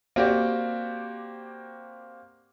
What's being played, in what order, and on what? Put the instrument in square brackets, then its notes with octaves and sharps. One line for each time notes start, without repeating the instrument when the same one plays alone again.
[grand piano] A#3 C4 F#4 G4 D5